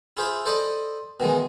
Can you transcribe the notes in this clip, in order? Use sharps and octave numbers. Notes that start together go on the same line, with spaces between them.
E4 F4 G#4 C5 E5 B5
A4 C5 D5 D#5 B5
B2 D#3 E3 G#3